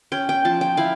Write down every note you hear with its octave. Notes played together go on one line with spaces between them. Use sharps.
C#4 G5
G5
F3 A5
G5
E4 F5